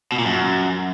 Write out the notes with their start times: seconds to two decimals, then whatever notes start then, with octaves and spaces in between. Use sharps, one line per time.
0.12 B2
0.19 A#2
0.25 F#2